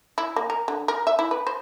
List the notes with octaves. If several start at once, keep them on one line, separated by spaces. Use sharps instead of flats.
E4
A#3
A#4
D3
A#4
E5
E4
B4
C5